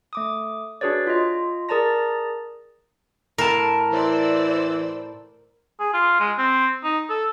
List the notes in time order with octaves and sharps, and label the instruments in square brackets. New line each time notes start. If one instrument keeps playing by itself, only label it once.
[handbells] A3 D6 D#6
D4 F#4 G#4 B4 C#5 D5
F4 D#5
G#4 A#4 D5 A5 A#5 A#6
[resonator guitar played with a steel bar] A2 A5 [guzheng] A#4
[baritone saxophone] E3 [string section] C5 D5 E6
[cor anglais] G#4
F4
G#3
C4
D#4
A4